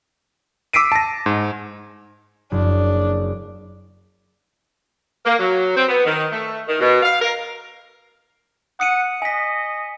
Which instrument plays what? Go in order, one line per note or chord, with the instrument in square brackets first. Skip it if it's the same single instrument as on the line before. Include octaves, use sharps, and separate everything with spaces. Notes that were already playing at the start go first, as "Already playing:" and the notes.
[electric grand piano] D6 E6 B6 C7 D7 D#7
A5 A#6
G#2
[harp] F#1 [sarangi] D4
[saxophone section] A#3
F#3
C4
B3
D#3
A3
D#3
B2
F5
A#4
[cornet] F#5 [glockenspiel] D#6 C#7 D#7
[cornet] D#5 [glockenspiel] G#5 B6